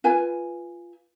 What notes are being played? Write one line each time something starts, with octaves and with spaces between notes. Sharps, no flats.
F4 B4 G#5